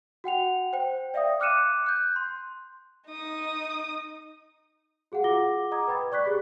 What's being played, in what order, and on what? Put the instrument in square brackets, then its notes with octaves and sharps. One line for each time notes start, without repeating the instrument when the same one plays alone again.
[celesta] F#4 F#5 G5 F7
C5 G5
D5 E5 F5 G5 D#6
D6 F6 F#6 C#7 D#7 E7
F#6 G6
C6
[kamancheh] D#4 D#6
[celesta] F#4 G#4 F5 F#5
F4 G#4 F#5 D6 A#6 G7
D#5 F#5 A#5 D6 D#6 G#6
B4 G5 B5 G#6 A6
D5 C#6 F#6 B6
G4 G#4 B5 F#6